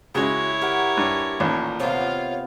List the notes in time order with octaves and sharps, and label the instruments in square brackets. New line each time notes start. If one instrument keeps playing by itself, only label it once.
[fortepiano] C#3 G#3 [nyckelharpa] E4 C#5 [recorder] F#4 [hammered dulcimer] G4
[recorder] G4 [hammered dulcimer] A#4 F#5 G5
[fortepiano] G2
[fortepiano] A1 D#2 [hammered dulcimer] A#2
[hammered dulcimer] C3 B3 [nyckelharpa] F4 F5 [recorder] C#5